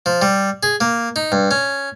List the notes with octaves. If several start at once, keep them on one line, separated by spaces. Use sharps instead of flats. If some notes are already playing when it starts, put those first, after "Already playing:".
F3
G3
G#4
A#3
D#4
G2
C#4